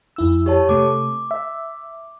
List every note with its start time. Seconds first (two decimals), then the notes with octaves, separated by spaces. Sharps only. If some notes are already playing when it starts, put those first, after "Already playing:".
0.16 F2 E4 E6
0.46 G4 C#5 A5
0.69 C3 A3 D6
1.31 E5